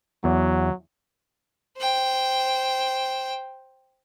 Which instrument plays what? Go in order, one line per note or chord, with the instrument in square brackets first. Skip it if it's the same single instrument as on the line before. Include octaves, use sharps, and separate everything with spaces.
[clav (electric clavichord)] E2 [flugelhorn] F#3
[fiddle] C5 G5